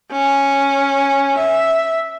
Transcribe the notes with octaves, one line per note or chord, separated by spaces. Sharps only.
C#4
E5